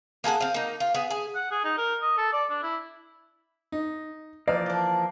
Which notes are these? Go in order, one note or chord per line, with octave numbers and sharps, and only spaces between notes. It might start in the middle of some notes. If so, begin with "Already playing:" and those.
A#3 G#4 A4 F#5
C4 F5
A#3 D#4
F4
B3 G#4
G#4
F#5
G#4
D#4
A#4
D#5
A4
D5
D4
E4
D#4
E3 F3 A#3 D5
D3 D4